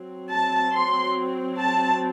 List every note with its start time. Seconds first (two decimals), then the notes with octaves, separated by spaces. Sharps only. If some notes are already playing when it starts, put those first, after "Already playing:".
Already playing: F#3 C4
0.31 A5
0.74 C6
1.59 A5